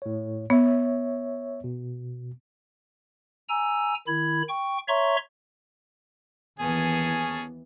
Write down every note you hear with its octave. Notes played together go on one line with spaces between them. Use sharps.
A2 C#5
B3 C#5 E5
B2
G#5 A#5 E6
D#3 E4 B5 G#6
G5 C#6
C#5 E5 A#5 C6 C#6
D#2 E3 B3 C#4 G#4 A5